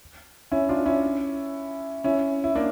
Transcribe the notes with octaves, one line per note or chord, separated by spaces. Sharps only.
C#4 E4
D4 F4
C#4 E4
C#4 E4
E4
A#3 D4